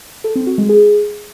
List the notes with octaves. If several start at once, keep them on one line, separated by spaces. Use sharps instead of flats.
A4
C4
F#4
G#3
G#4